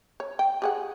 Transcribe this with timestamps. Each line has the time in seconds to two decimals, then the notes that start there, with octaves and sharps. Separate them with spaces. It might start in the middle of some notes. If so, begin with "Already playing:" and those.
0.20 C#5
0.39 G5
0.62 G4 G#4 F#5